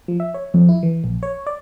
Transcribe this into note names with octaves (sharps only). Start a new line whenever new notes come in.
F3
E5
C#5
F2
E4
E3
A#1
C#5
D5